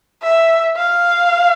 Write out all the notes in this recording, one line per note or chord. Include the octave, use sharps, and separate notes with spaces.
E5
F5